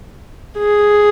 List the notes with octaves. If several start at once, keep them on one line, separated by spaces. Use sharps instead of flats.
G#4